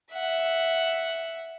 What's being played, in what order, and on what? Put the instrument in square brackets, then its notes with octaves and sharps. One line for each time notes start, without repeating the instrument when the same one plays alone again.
[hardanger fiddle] E5 F#5